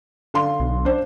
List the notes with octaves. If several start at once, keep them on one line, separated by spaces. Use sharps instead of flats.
D3 F5 C6
B1
D4 C5